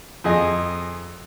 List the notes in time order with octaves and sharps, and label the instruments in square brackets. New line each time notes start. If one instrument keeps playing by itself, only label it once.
[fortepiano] F2 G#4 D#5